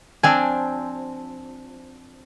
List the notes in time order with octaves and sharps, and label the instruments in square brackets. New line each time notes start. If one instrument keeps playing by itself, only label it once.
[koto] F3 C4 D4 [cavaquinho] G#5